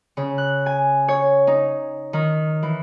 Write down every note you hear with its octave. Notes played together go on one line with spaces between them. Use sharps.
C#3
F#6
G#5
C#5
D#4
D#3
E3